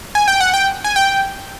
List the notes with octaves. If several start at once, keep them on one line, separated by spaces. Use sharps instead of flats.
G#5
G5
F#5
G5
G#5
G5